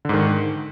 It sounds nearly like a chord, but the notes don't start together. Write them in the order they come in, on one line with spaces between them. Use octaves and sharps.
D3 G#2 D#3